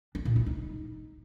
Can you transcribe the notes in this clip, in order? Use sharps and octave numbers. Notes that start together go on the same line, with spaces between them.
D4
A#2
E4
D#4